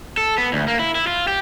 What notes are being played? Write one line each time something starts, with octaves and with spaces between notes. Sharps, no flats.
A4
B3
D2
A#3
E4
E4
F4
G4